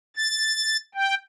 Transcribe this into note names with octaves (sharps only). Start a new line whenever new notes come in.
A6
G5